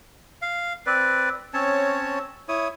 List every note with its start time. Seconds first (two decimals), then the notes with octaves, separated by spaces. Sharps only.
0.42 F5
0.86 C4 B4 D5
1.54 C4 C#4 C#5 A5
2.49 E4 C#5 D#6